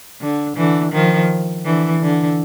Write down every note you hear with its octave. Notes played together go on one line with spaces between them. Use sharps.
D3
D3 E3
D#3 F3
D3 E3
D3